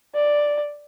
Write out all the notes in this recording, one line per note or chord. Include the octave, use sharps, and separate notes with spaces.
D5